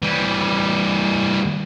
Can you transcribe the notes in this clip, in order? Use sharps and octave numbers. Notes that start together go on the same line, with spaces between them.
E3 G3